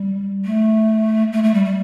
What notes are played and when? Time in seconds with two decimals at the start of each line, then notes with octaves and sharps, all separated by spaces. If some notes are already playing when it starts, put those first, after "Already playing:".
Already playing: G3
0.45 A3
1.33 A3
1.44 A3
1.54 G3
1.65 G3